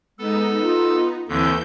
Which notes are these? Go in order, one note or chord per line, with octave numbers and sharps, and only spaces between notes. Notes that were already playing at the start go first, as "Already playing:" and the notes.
G#3 B3 D#4 A4
F4
D#2 D3 E3 C4 G6